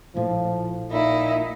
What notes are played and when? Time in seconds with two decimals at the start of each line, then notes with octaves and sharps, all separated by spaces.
0.15 A#1 A2 F3
0.92 A#2 D#4 E4